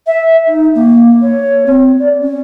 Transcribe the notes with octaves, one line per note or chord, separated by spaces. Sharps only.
E5
D#4
A#3
C#5
C4
D5
C#4